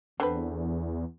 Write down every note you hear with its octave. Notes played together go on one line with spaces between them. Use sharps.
E2 D3 C4 B4